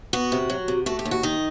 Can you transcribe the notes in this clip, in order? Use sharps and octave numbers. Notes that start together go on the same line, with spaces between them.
B3 F#4
C3
F#3
C3
A3 F#4
G4
D#2
F#4
D#3 D#4